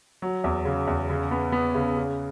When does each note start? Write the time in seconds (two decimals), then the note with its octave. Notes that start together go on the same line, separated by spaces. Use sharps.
0.22 F#3
0.44 E2
0.65 C#3
0.87 E2
1.10 C#3
1.31 B3
1.52 B3
1.75 C#3
1.96 C#3